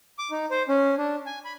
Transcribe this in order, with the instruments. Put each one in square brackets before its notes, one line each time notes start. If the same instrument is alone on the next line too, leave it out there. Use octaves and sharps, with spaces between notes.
[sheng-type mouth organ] D6
D#4
C5
C#4
D4
G#5
B5